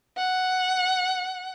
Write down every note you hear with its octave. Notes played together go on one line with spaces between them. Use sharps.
F#5